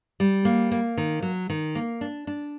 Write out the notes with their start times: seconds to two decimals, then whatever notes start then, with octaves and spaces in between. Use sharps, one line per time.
0.20 G3
0.45 A#3
0.72 A#3
0.97 D#3
1.22 F#3
1.50 D#3
1.75 A#3
2.01 D4
2.27 D4